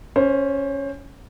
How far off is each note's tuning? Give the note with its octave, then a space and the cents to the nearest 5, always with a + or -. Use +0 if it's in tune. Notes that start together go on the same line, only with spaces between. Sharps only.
C#4 +0 C5 +20